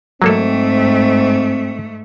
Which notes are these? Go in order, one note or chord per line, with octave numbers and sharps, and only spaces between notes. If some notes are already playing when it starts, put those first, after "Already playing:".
G#2 F#3 A3 A#3 C4 A4